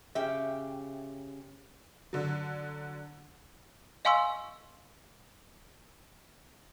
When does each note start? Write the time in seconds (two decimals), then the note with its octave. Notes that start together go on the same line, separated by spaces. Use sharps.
0.15 C#3 G4 E5 G5
2.13 D3 F#3
4.05 D#5 F5 G#5 C6 C#6 E6